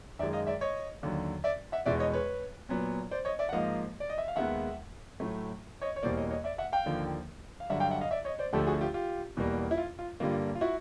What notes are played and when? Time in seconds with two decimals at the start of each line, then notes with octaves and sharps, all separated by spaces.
0.19 F#2 D#3 G#3 D5 E5
0.33 D#5 F5
0.47 D5 E5
0.61 C#5 D#5
1.03 D#2 D3 F#3
1.44 D5 E5
1.72 E5 F#5
1.86 E2 B2 G#3 D5 E5
1.99 C#5 D#5
2.13 B4 C#5
2.69 A#2 F#3 B3
3.11 C5 D5
3.25 C#5 D#5
3.39 D5 E5
3.49 F#5
3.52 G#2 F3 A#3 D#5 F5
4.00 D5
4.10 D#5
4.18 E5
4.28 F5
4.36 D#2 D#3 G#3 B3 E5 F#5
5.20 A2 F#3 A3
5.82 C#5 D#5
5.96 C#5
6.03 E2 B2 G3 A#3 C5 D5
6.17 C#5 D#5
6.30 C#5 D#5
6.44 D5 E5
6.58 E5 F#5
6.72 F5 G5
6.86 D#2 D3 F3 A#3
7.60 F5
7.70 G2 D3 F#3 E5 F#5
7.80 F5 G5
7.90 E5 F#5
8.01 D#5 F5
8.11 D5 E5
8.25 C#5 D#5
8.39 C5 D5
8.53 D2 D3 F3 A3 G4 A4
8.67 F#4 G#4
8.81 F4 G4
8.94 F4 G4
9.37 E2 B2 G3 A#3
9.71 E4
9.77 F4
9.99 F4
10.20 G2 D3 G3 A#3 F4
10.55 F4
10.61 E4 F#4